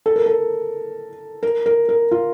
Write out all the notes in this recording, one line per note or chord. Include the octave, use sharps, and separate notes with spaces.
A4
A#4
A4
A#4
A#4
A#4
F4